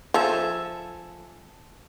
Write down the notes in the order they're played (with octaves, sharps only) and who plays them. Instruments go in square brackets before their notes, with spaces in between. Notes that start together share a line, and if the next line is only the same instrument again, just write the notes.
[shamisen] F3 [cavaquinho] A4 E5 G#5